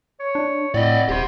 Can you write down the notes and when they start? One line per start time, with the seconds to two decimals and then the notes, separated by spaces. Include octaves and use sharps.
0.20 C#5
0.35 D4
0.74 A2 C4 D5 D#5 F#5 B5
1.09 D#1 G4 C5 C6